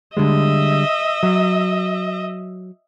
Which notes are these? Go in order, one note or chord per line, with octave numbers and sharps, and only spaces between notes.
D3 G3 G#3 D#5 E5
F#3